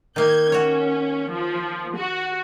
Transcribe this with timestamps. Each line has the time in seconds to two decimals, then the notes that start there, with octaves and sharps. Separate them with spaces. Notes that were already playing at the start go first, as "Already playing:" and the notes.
0.16 D#3 A#3 G6 G#6
0.52 C#4 F#4 C#5
1.30 F3
1.96 F#4